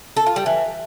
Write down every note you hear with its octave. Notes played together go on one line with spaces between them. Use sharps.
A4
F4
G3
E3